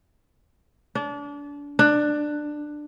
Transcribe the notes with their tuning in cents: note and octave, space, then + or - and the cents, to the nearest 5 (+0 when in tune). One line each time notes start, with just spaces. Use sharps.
D4 -30
D4 +15